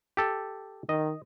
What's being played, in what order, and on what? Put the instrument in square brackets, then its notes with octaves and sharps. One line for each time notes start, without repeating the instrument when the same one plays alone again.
[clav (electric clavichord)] G4 A4
[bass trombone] D#3 [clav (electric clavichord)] D#5